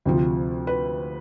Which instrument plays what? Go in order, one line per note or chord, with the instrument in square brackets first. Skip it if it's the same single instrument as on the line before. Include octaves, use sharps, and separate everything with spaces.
[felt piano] D2 C3 F3
B4